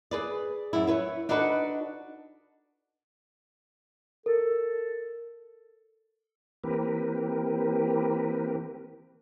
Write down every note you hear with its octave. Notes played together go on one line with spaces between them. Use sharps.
G#4 B4 D5
F#2 E4
E4 B4 C#5
D4 D#4 F#4 A4 B4
A4 A#4
E3 A#3 C4 G4 A#4 B4